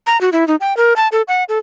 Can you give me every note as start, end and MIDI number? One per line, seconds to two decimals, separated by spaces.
0.07 0.20 82
0.21 0.30 66
0.33 0.47 64
0.48 0.56 63
0.61 0.76 79
0.77 0.94 70
0.96 1.08 81
1.12 1.22 69
1.28 1.44 78
1.49 1.58 69